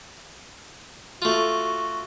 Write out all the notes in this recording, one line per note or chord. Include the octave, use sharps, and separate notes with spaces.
A3 F4 F#4